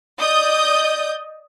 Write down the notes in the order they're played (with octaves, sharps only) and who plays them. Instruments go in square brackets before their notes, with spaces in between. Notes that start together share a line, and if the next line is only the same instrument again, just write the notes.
[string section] D5 D#5 D#6 G6